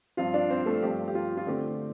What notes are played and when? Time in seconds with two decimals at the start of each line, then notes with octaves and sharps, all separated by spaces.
0.17 G2 F3 C4 F4 F5
0.34 D4 D5
0.50 C4 C5
0.66 A3 A4
0.82 G2 F3 C4 G4
1.08 G4
1.15 F4
1.37 F4
1.47 D3 A3 C4 G4